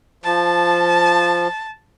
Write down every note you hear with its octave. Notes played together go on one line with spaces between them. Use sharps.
F3 A5